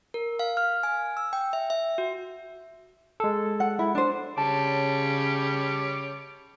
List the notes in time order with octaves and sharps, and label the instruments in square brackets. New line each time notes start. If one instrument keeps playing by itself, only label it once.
[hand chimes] A#4
F5
F6
G#5
E6
G5
E5
E5
F#4
[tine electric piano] G#3 A4
[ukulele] F#5
E4
D4 C5
[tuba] C#3 [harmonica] G3 C#5 D6 [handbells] A5